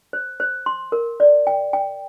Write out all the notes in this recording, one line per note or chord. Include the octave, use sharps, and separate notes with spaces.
C5
C5
C6
A#4
D5
G5
G5